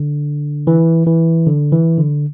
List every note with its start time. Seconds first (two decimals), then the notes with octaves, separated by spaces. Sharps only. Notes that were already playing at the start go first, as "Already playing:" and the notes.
Already playing: D3
0.67 E3
1.07 E3
1.47 D3
1.72 E3
1.98 D3